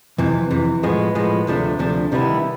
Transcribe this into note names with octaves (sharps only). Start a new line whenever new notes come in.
F2 C3 E3
F2 C3 E3
A2 F3 G#3 B3
A2 F3 G#3 B3
D2 C3 F3 A3 D4
D2 C3 F3 A3 D4
C3 D#3 G3 B3 E4